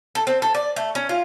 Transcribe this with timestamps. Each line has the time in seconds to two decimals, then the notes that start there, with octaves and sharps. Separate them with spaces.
0.15 A4
0.27 C4
0.42 A4
0.55 D5
0.76 A3
0.95 C#4
1.09 F4